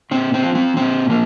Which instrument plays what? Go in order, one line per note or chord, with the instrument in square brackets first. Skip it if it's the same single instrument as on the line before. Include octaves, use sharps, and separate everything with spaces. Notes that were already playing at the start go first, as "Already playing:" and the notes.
[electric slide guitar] A#2 C4
C4
F3
C4
A#2 C4
F3 A#3